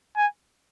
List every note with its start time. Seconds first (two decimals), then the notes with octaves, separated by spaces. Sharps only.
0.17 G#5